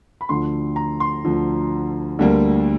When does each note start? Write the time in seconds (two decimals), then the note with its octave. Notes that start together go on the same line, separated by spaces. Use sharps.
0.21 B5
0.29 D2 D3 F3 C6
0.76 A#5
1.00 C6
1.25 D2 D3 F3
2.19 D2 D3 G3 A#3